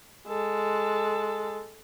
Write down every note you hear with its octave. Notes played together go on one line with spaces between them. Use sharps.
G#3 A4